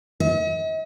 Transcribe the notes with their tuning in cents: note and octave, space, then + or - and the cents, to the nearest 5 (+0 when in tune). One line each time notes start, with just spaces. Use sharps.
D#5 +45